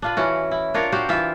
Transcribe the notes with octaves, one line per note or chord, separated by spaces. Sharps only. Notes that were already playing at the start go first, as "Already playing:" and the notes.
D4 F4 B4
E3 C#4 F#4
E4
D4 F4 A#4 C#5
F#4 G4 C5 F5
E3 F4 E5